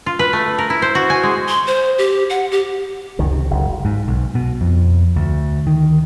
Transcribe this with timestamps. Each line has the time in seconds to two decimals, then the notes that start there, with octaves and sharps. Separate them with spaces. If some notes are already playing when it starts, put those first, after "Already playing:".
0.06 F4
0.19 B4
0.33 A3
0.58 A#4
0.70 E4
0.82 C5
0.95 F#4
1.10 G#5
1.23 G#3
1.48 C6
1.67 C5
1.98 G4
2.30 F#5
2.52 G4
3.19 C#2 F#2 D#3
3.31 C3
3.50 F#1
3.85 G#2
4.08 B1
4.35 B2
4.61 F2
5.16 D2
5.67 D#3